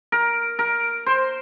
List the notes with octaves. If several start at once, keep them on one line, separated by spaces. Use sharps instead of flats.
A#4
A#4
C5